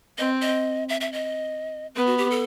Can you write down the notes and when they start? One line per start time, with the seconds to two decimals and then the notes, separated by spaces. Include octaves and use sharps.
0.18 C4 D#5
0.42 D#5
0.89 E5
1.01 E5
1.13 D#5
1.95 B3 B4
2.06 F#4
2.18 G4
2.31 A4